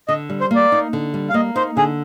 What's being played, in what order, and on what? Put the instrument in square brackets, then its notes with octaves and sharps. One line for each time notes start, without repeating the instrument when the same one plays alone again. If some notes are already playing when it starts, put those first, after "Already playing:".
[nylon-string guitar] D3 [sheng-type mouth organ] D#5
[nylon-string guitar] G3
[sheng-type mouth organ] C5
[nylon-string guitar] A#3 [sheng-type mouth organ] D5
[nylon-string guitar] D#4
D3
G3
[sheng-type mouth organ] F5
[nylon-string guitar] A#3 [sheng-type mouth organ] D#5
[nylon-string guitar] D#4 [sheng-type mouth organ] C5
[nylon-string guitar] D3 [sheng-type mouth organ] G#4